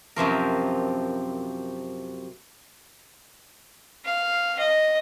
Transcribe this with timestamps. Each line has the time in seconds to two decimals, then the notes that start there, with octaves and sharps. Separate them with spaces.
0.16 F#2 C3 F3 A#4
4.04 F5
4.59 D#5